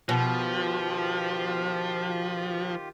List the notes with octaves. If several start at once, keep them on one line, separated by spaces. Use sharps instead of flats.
B2 D#3 F3 F4 G4